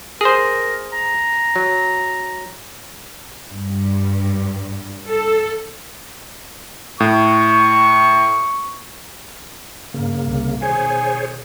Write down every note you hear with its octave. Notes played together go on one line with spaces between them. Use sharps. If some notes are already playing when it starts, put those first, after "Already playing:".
G#4 A#4 C5
A#5
F#3
G2
A4
A2 C#6
G2 C#3 A#3
C2 C3
B2 D#3 G#4 C5 C#5 G#5